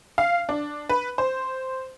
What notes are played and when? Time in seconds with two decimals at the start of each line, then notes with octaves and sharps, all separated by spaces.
0.18 F5
0.49 D4
0.89 B4
1.18 C5